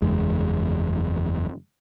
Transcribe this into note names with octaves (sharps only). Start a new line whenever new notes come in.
F#1 E2 G#3